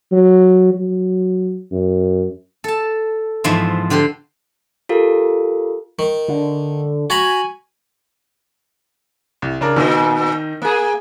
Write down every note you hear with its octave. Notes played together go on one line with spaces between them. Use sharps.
F#3
F#3
F#2
A4 A5
E2 G#2 F3 E5
D3 G4 C5 C6
F4 G4 A4 A#4 F5
D#3
D3
F#4 G#5 A#5 B5
C2
C#3 D4 A#4
A#2 D#3 D#4
A#3 G#4